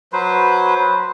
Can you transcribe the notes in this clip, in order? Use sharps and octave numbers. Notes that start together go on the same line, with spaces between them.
F#3 B4 C5